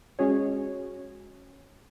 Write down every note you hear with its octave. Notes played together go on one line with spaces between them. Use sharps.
G#3 C#4 F#4 G#4 C#5